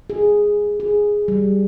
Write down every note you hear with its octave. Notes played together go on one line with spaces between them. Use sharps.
G#4
G#4
G3